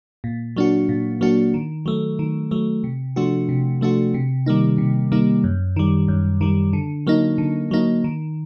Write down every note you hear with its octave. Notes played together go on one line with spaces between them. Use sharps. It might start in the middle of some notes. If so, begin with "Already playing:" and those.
A#2
F#3 A#3 D4 F#4
A#2
F#3 A#3 D4 F#4
D#3
F#3 A3
D#3
F#3 A3
C3
F3 A3 D4 F#4
C3
F3 A3 D4 F#4
C3
D#3 G3 A#3 D#4
C3
D#3 G3 A#3 D#4
F#2
D#3 G3
F#2
D#3 G3
D3
F#3 A#3 D#4
D3
F#3 A#3 D#4
D#3